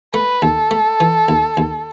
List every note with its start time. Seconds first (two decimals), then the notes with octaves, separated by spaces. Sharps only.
0.14 A3 B4
0.42 D#2 A4
0.71 A3
1.00 E3
1.28 D#2
1.57 D#2